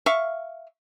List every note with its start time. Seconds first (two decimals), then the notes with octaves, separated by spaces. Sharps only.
0.06 E5 F5 C#6